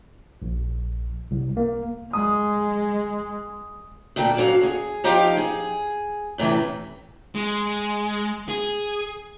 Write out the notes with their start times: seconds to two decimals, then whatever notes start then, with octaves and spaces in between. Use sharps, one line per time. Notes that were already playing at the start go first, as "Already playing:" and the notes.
0.42 A#1
1.31 C2
1.57 A#3
2.13 G#3 D#6
4.16 D2 A#2 A4 G5
4.37 G#2 F#3 F#4 F5
4.63 G#4
5.04 F3 D#4 G4 F5 G5
5.37 G#4
6.38 F#2 A2 C3 E3
7.35 G#3
8.49 G#4